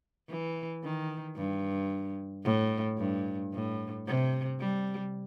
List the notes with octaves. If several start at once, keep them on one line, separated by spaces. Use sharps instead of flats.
E3
D#3
G2
A2
G2
A2
C3
G3